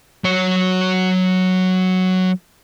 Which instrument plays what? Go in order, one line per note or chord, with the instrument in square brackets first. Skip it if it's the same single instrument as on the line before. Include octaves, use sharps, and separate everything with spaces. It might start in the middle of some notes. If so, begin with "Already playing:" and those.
[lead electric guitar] F#3 C#5